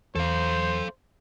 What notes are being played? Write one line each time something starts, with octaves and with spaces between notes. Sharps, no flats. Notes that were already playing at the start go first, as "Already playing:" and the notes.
E2 A4 C5 F5